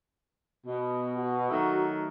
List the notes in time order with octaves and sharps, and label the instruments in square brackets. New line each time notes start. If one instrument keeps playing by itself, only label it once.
[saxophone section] B2
[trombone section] F#4
[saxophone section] D#3 F#3 A3